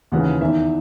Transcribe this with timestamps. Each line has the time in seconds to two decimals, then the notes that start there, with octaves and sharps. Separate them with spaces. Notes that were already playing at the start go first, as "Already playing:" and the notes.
0.12 D#2 C#3 E3 F#5
0.40 E2 D#3 E5